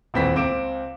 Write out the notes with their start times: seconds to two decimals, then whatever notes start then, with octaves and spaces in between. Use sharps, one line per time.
0.14 D#1 A1 C4 B4 B6
0.36 C#2 C4 D6 D7 E7